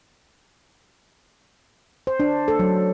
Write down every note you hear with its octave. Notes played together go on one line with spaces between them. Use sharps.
C5
D4
A4
F#3